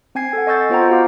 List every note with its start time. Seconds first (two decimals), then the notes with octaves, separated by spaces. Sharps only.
0.15 C4 G5 G#5 G#6 C7
0.33 A4 F#5
0.47 D#5 G#5 C#6 E6 G6 A6
0.70 B3 F4 C5 F#5 G5 A#5
0.88 F4 F#4 F5 D6